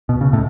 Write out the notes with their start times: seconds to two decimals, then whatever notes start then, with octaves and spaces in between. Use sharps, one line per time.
0.09 B2
0.21 C#3
0.33 A2